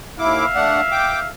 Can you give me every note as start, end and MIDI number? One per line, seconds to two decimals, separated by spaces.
0.19 0.46 39
0.19 0.46 64
0.19 1.28 76
0.19 1.28 77
0.19 0.46 86
0.55 0.81 57
0.55 0.81 62
0.55 0.81 78
0.92 1.20 79
0.92 1.20 86